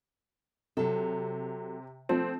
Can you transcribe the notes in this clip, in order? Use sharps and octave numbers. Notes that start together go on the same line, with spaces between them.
C3 F#3 A4
F3 A3 C4